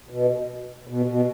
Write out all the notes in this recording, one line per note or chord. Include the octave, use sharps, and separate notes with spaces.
B2
B2
B2